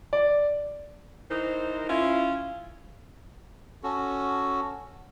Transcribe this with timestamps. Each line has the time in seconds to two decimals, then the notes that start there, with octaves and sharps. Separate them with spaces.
0.13 D5
1.31 E3 D#4 A#4 C5
1.90 C#4 E4 F4
3.83 C#4 F#4 A4